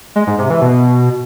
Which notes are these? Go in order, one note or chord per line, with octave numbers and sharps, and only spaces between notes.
G#3
G#2
C3
E3
B2